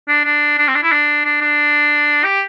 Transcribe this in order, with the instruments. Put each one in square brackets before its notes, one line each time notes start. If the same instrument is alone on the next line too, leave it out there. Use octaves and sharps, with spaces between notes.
[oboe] D4
D4
D4
C4
D4
E4
D4
D4
D4
G4